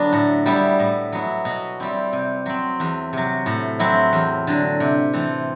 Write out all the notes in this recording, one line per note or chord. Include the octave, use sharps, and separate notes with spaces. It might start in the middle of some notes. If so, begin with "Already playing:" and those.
Already playing: D3 F#3 B3 D4
A2
G3 B3 E4
A2
F#3 B3 E4
B2
G3 C4 E4
C3
F#3 C4
E2
C3 F#3
A2
F#3 C4 E4
E2
D3 F#3
C3
E3 A3 C4